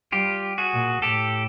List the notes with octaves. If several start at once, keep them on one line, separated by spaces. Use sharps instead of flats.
G3 F4 G4
F#4 G#4
A#2
A2 G4 A4